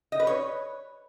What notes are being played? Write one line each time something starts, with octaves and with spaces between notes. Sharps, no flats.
D#5
B4
C#5